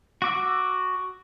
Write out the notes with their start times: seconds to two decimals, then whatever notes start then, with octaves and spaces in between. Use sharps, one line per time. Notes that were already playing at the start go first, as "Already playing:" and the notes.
0.22 F#4 D6 E6